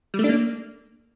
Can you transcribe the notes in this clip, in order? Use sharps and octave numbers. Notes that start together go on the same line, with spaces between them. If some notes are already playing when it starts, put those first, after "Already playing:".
G3
A3
D4
A#3